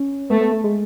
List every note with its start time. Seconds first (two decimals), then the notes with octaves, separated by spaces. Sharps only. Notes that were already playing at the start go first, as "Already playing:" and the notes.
Already playing: C#4
0.30 A3 B3
0.41 B3
0.52 A3
0.64 G#3